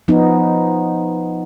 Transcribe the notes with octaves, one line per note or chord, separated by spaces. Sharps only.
F3 B3 D#4